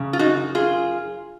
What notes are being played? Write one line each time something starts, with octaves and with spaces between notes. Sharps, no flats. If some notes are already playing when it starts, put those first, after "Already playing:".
Already playing: F#2 C#3
F4
D#4 F#4
F4 G#4